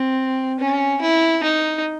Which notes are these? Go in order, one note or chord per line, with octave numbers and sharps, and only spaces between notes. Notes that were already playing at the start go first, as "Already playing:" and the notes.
Already playing: C4
C#4
E4
D#4